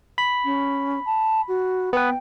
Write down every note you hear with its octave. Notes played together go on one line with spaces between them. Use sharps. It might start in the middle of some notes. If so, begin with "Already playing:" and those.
B5
C#4
A5
F#4
B3 B4 G5